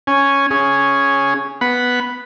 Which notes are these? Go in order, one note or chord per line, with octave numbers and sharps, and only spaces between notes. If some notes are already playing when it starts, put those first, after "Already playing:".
C#4 G#5
C#4 G#4
B3 F#5 B5